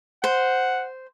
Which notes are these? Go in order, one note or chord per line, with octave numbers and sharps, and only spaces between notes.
C5 F#5